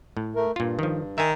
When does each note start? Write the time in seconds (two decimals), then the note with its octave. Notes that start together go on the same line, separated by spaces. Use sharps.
0.17 A2
0.36 A3 A#4
0.56 G2 A#2 F4
0.79 D#3 F3
1.18 D#3 E5 G#5